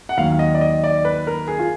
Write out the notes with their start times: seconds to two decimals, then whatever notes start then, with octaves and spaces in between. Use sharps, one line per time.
0.09 F#5
0.17 D#2 D#3 F#3 F5
0.32 F5
0.39 D#5
0.55 D5
0.61 D#5
0.84 D5
1.05 B4
1.27 A#4
1.48 G#4
1.59 F4